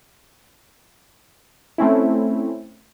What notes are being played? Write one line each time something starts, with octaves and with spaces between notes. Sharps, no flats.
A3 C4 C#4 E4